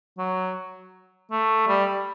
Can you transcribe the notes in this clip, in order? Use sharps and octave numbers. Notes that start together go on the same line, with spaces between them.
F#3
A3
G3